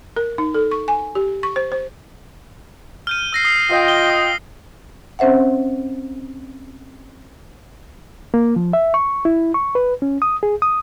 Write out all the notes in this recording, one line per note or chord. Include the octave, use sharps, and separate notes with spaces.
A#4
D#4
A4
C#6
G#5
G4
C#6
C5
C5
F6 G6 D#7
E6 A#6 C7
D#6 C7
F4 D#5 G5
G7
D#6
C4 C#4 C5 E5 F#5
A#3
F3
E5
C#6
E4
C#6
B4
C#4
D#6
G#4
D#6